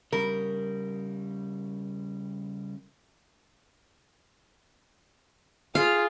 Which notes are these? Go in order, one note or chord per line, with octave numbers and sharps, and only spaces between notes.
C#3 G3 A#4
F4 G#4 F5